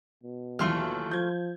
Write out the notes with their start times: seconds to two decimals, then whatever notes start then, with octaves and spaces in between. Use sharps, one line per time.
0.23 B2
0.59 D#2 E3 F#3 A3 F4 F6
1.11 F3 G6 G#6